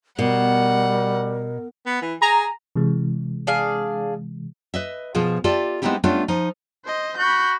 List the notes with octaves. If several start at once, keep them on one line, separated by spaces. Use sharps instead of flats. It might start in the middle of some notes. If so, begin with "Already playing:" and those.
B2 G3 A#4 F#5
B3
E3
G#4 A#5
C3 E3 G#3
D4 G#4 F5
B4 D#5 E5
B2 F3 F4 G#4
F4 G4 A4 D5 E5
G#3 B3 C4 D#4 E4 G4
G3 A3 B3 C#4 D4 F4
F3 D#4
C5 D#5
F#4 B5 G6